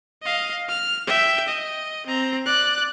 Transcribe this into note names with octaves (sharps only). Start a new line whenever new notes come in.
D#5 F5
F6
E5 G5
D#5
C4 A#5
D5 F#6